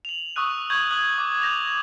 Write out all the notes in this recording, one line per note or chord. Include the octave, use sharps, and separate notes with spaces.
F7 F#7
C#6 D#6 E6 F#6 D#7
C#6 G6 G#6 F#7
D#6 F#6 F#7
D6
G6 A#6 F7